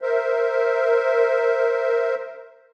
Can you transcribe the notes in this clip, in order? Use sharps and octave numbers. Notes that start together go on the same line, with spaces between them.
A#4 C5 E5